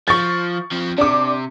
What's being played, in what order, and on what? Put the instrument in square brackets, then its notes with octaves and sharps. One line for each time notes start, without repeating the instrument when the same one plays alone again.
[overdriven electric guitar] F3 [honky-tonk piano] C#6 A6
[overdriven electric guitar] F3 C4
[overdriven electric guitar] C3 [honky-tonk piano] D4 D6